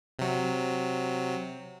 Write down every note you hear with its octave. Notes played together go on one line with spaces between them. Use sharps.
C3 F#3